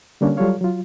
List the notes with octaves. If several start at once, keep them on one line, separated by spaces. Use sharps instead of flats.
D3 G3 A#3 C#4 D4 C#5
F#3 G3 F4 A4 C#5 F5
F#3 F4